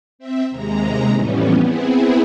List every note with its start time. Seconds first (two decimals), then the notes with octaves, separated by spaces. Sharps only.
0.19 C4 E5
0.51 D#2 C3 G#3 A#5
1.13 F2 A2 E3 G3 B3 C#4
1.58 B3 C4 E4 G#4